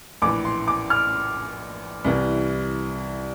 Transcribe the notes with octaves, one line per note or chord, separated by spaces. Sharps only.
A#1 A2 E3 D6
C6
D6
F6
C2 C3 E3